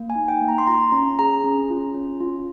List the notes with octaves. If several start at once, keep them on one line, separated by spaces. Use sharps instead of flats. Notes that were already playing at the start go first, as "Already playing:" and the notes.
Already playing: A#3
G#5
D#4
G5
A#3
A#5
C6
F4 A#5
C#4 A#5
G#4 A#5
C#4
F4
C#4
F4